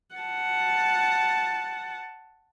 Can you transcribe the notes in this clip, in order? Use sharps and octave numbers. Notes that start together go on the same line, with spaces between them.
F#5 A5